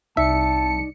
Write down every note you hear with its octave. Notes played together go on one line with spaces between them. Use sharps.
C2 D#4 D5 E5 A5 C#7